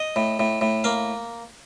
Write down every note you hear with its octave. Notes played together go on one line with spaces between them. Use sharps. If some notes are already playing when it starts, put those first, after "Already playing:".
Already playing: D#5
A2
A2
A2
A#3 F5